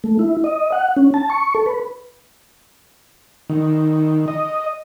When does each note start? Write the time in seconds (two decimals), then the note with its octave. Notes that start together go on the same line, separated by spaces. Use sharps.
0.04 A3
0.19 E4
0.44 D#5
0.72 F#5
0.97 C#4
1.14 A5
1.30 C#6
1.55 A4
1.66 B4
3.50 D#3
4.28 D#5